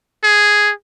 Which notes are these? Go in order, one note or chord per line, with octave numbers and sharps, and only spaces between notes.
G#4